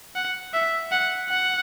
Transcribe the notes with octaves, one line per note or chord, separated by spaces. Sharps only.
F#5
E5
F#5
F#5